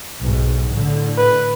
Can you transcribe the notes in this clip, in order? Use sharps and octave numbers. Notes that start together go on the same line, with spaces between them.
B1 G#2
A2 D3
B4